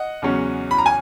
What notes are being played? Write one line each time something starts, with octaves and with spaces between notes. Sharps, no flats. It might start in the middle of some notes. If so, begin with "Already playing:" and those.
Already playing: D#5 F#5
E2 C#3 F#3 C#4
B5
A#5
G#5